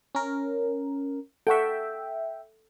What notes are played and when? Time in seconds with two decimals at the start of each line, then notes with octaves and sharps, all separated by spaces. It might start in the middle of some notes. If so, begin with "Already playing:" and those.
0.15 C#4 A#4
1.47 A4 E5 F#5 G5 C#6